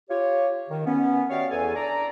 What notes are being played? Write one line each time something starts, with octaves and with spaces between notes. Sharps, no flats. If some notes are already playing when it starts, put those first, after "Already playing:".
F4 G4 C#5
D#3
B3 C#4
F#4 G4 C#5 D5 E5 F5
E2 A4 G#5
D4 D5 A#5